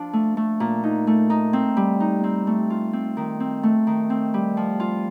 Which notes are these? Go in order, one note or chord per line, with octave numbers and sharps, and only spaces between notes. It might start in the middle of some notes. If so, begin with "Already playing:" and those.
Already playing: F3 D4
A3
A3
A#2
D#4
A3
D#4
C4
G3
D#4
C4
A3
F4
C4
D#3
C4
A3
D#3
C4
G3
F3
F4